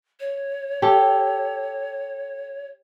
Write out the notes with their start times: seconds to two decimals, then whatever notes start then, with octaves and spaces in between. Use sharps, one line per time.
0.20 C#5
0.82 G4 A4